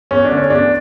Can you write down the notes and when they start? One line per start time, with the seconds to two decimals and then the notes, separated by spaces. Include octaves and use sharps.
0.11 E2 C#4
0.24 D4
0.31 D3 A3
0.37 C#4
0.50 E2 D4